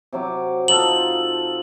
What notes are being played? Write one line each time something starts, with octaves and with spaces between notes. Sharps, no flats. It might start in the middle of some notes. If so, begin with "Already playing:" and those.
C3 F#3 D6
D#4 F4 A4 F#7